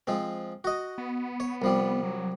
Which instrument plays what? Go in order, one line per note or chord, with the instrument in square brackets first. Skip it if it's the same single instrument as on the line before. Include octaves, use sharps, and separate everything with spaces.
[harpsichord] F3 G#3 C4
F#4 D#5
[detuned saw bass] B3
[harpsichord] C#5
C2 F3 G3
[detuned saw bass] F#3